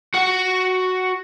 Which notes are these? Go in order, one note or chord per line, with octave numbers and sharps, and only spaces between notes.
F#4 F#5